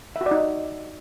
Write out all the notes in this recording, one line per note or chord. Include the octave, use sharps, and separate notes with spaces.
E5
F#4
D5
D#4